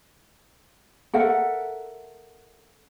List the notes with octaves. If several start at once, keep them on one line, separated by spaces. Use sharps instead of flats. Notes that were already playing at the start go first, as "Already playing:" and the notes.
A4 A#4 E5 F#5